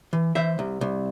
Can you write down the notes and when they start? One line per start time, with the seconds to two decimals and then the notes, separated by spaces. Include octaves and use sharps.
0.13 E3
0.35 E3 C5 E5
0.59 C2
0.81 C2